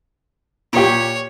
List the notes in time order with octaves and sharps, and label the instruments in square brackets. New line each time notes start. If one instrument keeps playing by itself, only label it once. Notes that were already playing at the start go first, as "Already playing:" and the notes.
[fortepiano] A#2 G4 [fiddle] C#5